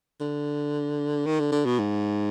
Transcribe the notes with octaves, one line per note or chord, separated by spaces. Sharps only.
D3
D#3
D3
D3
B2
G#2